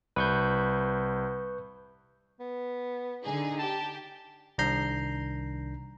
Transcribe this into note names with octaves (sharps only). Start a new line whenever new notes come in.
C2 B4 C#6 G6
B3
D3 D#4 G#4
G4 A5
C2 D#3 D4 A#5 G6 C7